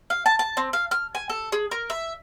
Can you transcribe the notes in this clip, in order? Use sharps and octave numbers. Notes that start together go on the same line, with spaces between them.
F5
A5
A5
C4
F5
F6
G#5
A4
G#4
A#4
E5